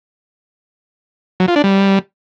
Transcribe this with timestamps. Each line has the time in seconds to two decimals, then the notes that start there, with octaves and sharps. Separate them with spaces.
1.40 F#3
1.48 F4
1.56 D4
1.64 G3